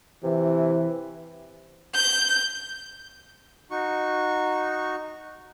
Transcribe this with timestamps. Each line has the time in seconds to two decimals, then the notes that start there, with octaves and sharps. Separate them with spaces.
0.24 C3 E3
1.95 G6
3.71 D#4 F#4 C#6